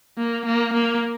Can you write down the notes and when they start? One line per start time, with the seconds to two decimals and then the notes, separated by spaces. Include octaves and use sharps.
0.18 A#3
0.46 A#3
0.74 A#3